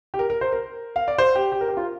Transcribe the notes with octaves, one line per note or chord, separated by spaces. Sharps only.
G4
A#4
A#4
C5
A#4
F5
D5
C5
G4
G4
A#4
G4
F4